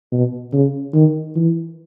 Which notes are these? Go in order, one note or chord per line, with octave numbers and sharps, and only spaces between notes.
B2
C#3
D#3
E3